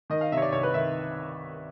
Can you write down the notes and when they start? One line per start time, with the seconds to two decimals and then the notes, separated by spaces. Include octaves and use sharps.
0.10 D#3 D#5
0.21 F5
0.32 C3 E5
0.37 C#5
0.42 D5
0.52 C2 C#5
0.63 B4
0.74 D#3 E5